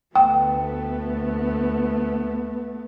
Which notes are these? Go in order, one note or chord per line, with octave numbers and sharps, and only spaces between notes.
D2 A3 B3 G5